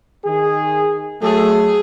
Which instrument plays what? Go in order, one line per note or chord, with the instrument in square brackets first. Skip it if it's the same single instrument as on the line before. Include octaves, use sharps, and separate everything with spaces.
[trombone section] D#3 G#4
[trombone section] F#3 A3 A4 [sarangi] G#4